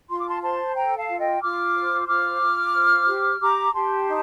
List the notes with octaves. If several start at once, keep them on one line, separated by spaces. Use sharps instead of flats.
F4 C6
D6
A5 C6
C5 A5 C6
A4 G5 A#5
F5 A5
F4
D#5 G5
F4 D6 F6
C5
F4 D6 F6
F4
C5
G4
G4 A#5 D6
G4 A5 C6
D#4